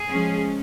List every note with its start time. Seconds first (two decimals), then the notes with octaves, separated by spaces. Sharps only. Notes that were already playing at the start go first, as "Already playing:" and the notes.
Already playing: G#4
0.09 F3 G#3 C#4